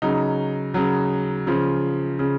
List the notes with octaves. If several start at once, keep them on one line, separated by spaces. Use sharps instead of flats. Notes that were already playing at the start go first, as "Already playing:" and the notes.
C#3 F#3 D#4
C#3 F#3
C#3 F3
C#3